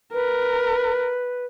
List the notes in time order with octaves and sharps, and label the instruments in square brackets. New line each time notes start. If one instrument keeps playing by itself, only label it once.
[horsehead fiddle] A#4 [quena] B4